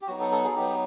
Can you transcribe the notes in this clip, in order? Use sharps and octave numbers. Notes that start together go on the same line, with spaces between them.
G4
F#3 B3 D#4 F#4
A4
A4
G#4
F#3 B3 D#4 G4